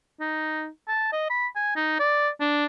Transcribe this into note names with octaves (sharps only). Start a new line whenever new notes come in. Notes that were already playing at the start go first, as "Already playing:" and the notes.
D#4
A5
D#5
B5
G#5
D#4
D5
D4